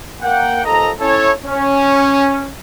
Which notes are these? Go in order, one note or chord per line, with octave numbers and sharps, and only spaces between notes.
A#3 F#5 G5
D#2 F3 A4 D#5 A#5
C#4 E4 A4 C#5
C#4